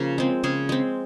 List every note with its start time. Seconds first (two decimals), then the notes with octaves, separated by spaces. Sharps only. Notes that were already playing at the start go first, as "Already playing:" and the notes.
Already playing: C#3 F3 A#3
0.18 G#3 C4
0.44 C#3 G#4
0.69 G#3 C4